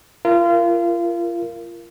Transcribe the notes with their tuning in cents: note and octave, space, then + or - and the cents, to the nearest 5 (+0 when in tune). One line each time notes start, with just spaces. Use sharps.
F4 -30 A#4 +0